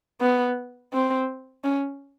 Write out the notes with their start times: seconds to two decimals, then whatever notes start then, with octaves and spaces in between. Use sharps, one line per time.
0.21 B3
0.93 C4
1.64 C#4